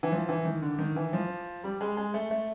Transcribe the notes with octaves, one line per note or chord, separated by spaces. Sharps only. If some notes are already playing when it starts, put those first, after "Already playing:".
E3
F3
E3
D#3
D3
D#3
E3
F3
G3
G#3
G#3
A3
A3